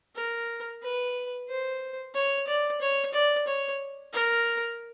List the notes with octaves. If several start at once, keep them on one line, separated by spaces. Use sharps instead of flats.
A#4
B4
C5
C#5
D5
C#5
D5
C#5
A#4